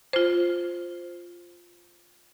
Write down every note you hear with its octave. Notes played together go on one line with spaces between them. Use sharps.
F4 C5